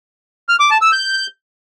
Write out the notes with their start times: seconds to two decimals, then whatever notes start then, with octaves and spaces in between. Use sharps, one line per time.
0.49 F6
0.60 D6
0.71 A5
0.82 E6
0.92 G6